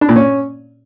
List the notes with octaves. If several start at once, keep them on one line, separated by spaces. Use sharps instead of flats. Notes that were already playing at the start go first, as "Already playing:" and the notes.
D4
A#2
C#4